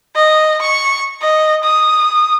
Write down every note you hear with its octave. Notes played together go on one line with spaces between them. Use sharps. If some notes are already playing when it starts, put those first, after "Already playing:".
D#5
C#6
D#5
D#6